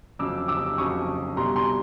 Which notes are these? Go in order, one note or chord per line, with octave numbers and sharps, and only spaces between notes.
F2 C#3 F#3 D6 E6
D6 E6
F2 C#3 F#3 C#6 D#6
C2 B2 G3 A#5 C6
A#5 C6